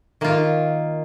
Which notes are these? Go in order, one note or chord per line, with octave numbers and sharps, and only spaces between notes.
D#3 A#3 F4